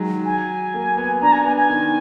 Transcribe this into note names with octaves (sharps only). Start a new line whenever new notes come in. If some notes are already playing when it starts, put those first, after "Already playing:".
Already playing: D#3 F#3 G#3
G#5
A#3
B3
D4 A#5
G#5
B3 G#5
G#5
D#3